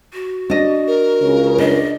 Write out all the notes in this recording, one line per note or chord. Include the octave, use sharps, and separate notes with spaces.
F#4
D4 D#5
A#4
C#2 C#3
D4 D#5